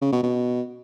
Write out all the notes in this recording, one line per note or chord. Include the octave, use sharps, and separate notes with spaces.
C#3
B2
B2